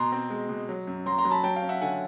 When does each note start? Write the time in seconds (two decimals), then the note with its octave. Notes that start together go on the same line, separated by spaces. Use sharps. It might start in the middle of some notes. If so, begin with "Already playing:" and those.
Already playing: B2 A#5 C6
0.12 C4
0.30 G#3
0.49 B2
0.69 F#3
0.87 F#2
1.06 F#3 A#5 C6
1.18 A#5 C6
1.25 F#3
1.31 A5 B5
1.43 F#3 G5 A5
1.56 F5 G5
1.63 C#4
1.69 E5 F#5
1.81 D3 F#5 G#5